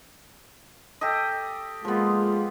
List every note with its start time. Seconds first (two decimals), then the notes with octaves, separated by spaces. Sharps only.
1.01 G4 A4 D#5
1.85 F3 G#3 A#3 B3 F4